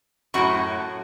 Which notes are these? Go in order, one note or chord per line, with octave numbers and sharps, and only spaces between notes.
F#2 A2 F#4 F#5 C#6